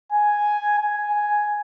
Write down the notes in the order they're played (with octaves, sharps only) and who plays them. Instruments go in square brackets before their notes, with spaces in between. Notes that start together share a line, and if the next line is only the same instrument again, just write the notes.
[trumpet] G#5
G#5